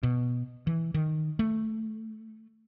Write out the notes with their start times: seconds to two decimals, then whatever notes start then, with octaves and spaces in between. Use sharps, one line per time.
0.03 B2
0.67 E3
0.94 D#3
1.39 A3